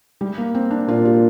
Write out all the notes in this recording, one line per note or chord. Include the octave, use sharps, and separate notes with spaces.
G3
A#3
C4
D4
A#2 F4
G4